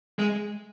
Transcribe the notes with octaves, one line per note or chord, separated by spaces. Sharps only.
G#3